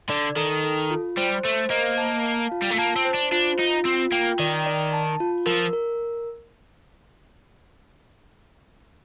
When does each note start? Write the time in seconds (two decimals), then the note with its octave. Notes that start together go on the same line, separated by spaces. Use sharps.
0.09 D3 D5
0.36 D#3 A4
0.64 A4
0.90 F4
1.17 G3 C5
1.44 A3 C5
1.70 A#3 D#5
1.98 A5
2.25 F5
2.52 F4
2.62 G3
2.70 A3
2.78 A#3 A5
2.96 C4
3.05 C5
3.14 D4
3.32 D4 F4
3.59 D#4 F4
3.85 C4 F4
4.12 A#3 G5
4.39 D#3 D5
4.66 D5
4.93 A5
5.20 F4
5.46 F3 A#4
5.73 A#4